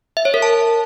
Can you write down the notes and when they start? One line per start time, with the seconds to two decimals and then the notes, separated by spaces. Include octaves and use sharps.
0.17 E5
0.25 C#5
0.34 A#4
0.42 A5